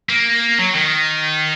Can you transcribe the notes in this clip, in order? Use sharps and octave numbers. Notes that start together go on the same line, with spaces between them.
A#3
F#3
D#3